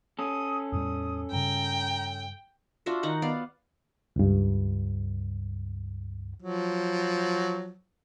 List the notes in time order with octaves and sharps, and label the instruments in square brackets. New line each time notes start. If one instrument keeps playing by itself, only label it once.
[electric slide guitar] C#4 A4 [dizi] D#6
[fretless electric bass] E2 A2 G3 [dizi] D#6
[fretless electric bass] G2 C#3 [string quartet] G5 [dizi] A#5
[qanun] D4 F4 F#4 E5
D#3 D#4 F#5
B3 D5 F5
[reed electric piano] C#2 G2
[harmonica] F3 F#3